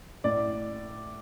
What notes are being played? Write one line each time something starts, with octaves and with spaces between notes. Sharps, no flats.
A2 D5